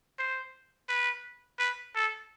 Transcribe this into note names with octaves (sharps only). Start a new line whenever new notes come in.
C5
B4
B4
A4